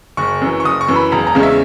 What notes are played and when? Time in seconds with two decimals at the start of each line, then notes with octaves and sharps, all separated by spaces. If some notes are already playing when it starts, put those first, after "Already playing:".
0.17 F#1 C#6
0.41 F#2 E3
0.60 C#6
0.64 F#1 D#6
0.81 C#6
0.88 F#2 E3
0.96 B5
1.12 E1 A#5
1.27 A#5
1.35 E2 C#3 G#3 C#4
1.43 E5